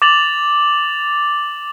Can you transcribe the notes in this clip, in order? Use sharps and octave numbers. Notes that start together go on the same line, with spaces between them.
D6 A6 F7 F#7